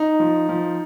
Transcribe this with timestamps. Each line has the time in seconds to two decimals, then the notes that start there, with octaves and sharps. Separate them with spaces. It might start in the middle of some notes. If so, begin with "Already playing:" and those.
Already playing: D#4
0.20 F3
0.49 F3